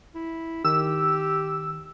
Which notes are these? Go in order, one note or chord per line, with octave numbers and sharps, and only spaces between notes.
E4
D#3 G4 E6